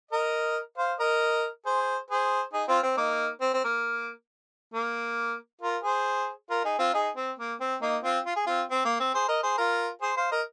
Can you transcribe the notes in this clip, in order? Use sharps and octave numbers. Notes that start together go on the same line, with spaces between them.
A#4 D#5
C5 F5
A#4 D#5
G#4 C5
G#4 C5
D#4 G#4
C4 F4
C4
A#3 D#4
C4
C4
A#3
A#3
F4 A#4
G#4 C5
F4 A#4
D#4 G#4
C4 F4
D#4 G#4
C4
A#3
C4
A#3 D#4
C4 F4
F4
G#4
C4 F4
C4
A#3
C4
G#4 C5
A#4 D#5
G#4 C5
F4 A#4
G#4 C5
C5 F5
A#4 D#5